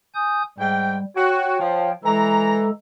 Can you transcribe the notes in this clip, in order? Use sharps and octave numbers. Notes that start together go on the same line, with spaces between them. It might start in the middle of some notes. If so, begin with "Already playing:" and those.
G#5 D#6 G6
G#2 G3 G5
F#4 C#5 G5
F3
E3 G#3 A4 A#5